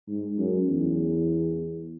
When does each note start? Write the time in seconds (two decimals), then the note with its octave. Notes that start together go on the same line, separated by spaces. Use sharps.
0.08 G#2
0.38 F#2
0.68 E2